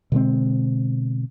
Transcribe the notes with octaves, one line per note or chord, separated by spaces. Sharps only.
B2 D3 G#3 C4